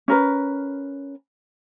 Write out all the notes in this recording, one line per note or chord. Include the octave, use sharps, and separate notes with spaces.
C#4 A#4 B4